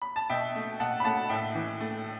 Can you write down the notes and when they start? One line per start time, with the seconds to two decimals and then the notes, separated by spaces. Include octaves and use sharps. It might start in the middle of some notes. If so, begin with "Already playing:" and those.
0.02 B5
0.16 A5
0.29 B2 E5 G5
0.55 A3
0.80 B2 F#5 A5
1.00 B5
1.04 A3 F#5 A5
1.29 A2 E5 G5
1.55 E3
1.80 A3